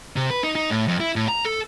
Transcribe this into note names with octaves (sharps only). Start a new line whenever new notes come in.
C3
B4
D#4
D#4
A2
F2
E4
A2
A#5
A4